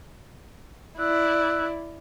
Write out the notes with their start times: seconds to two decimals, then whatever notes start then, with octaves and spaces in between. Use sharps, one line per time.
0.99 E4 D5 E6 F#6